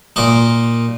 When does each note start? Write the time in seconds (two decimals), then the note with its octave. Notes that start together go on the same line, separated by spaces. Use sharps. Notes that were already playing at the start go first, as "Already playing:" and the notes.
0.16 A#2 D#4